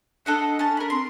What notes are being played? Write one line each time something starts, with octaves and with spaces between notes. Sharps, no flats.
D4 A4 D#5 F#5
C#4 A5
A#4 B5
C4 C6